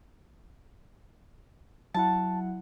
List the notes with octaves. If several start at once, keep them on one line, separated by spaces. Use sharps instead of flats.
F#3 E4 F#5 A5